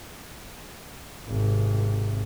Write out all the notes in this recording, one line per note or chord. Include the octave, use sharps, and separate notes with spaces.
G#1 C3